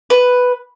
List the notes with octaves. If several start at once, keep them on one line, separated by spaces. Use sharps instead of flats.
B4